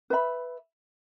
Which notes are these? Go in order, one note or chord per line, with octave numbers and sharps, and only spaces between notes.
B4 E5 B5